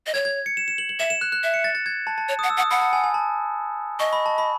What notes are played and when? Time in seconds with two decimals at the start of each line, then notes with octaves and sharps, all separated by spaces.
0.06 D#5
0.14 C#5 G#6
0.25 G#6
0.46 C#7
0.57 E7
0.68 E7
0.78 F#7
0.89 F#7
0.99 E5 E7
1.10 E7
1.21 F#6
1.32 F#6
1.43 E5
1.54 C#7
1.64 A6
1.75 A6
1.86 G#6
2.07 A5
2.18 A5
2.29 C#5
2.39 F#5 D#6
2.50 E6
2.57 F#5
2.61 D#6
2.71 F#5 B5
2.82 A5
2.93 G#5
3.04 G#5
3.14 A5
4.00 D#5 C#6
4.13 B5
4.26 A5
4.38 B5